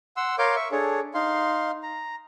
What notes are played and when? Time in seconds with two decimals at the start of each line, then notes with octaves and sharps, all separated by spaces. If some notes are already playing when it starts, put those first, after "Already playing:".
0.17 F#5 C6 E6
0.38 A#4 C#5 F5 C6 D6 G6
0.56 E5 C#6
0.72 D4 G#4 A4 C#5
1.14 D#4 F5 C6
1.83 A#5